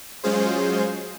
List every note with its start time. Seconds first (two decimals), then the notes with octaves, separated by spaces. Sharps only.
0.24 F#3 G#3 C#4 F4 G#4 C5